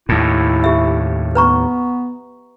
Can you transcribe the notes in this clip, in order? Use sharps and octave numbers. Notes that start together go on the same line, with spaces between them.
D#2 A2 E4
G4 E5
B3 B4 A#5 C#6